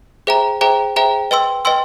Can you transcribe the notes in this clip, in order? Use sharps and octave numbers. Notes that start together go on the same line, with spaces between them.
G#4 C5 E5 G5 A#5
G#4 C5 E5 G5 A#5
G#4 C5 E5 G5 A#5
B4 D#5 G5 C6 E6
B4 D#5 G5 C6 E6